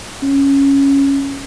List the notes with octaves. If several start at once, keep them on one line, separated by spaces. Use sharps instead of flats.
C#4